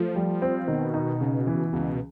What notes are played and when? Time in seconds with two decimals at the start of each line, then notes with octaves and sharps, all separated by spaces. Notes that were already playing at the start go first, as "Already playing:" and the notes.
Already playing: F3 A3
0.16 G3
0.42 C4
0.68 B2 D#3
0.94 D#4
1.21 C#3
1.47 E3
1.73 C#2 B2